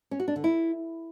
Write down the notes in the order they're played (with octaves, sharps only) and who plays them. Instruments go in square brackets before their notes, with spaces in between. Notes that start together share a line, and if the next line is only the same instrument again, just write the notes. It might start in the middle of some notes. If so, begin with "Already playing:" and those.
[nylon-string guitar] C#4
F#4
D4
D3
E4